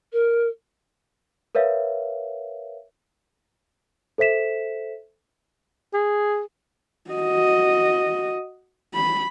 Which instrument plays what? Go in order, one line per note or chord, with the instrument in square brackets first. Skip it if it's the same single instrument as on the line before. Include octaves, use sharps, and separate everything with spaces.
[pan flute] A#4
[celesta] A#4 B4 C#5 E5 F5
A4 C5 E5 B6 E7
[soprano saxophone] G#4
[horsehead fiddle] F#4 D#5
B5